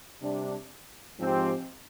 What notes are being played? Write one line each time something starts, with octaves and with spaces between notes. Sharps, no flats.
C3 G3 D4
G#2 F3 C4 G4